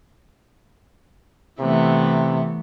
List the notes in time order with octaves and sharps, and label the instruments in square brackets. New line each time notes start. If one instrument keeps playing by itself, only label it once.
[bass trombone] C3 [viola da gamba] E3 A3 B3